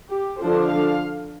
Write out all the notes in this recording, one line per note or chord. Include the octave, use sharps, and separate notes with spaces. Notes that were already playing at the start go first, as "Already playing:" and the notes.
G4
D3 F3 D4 C5
F5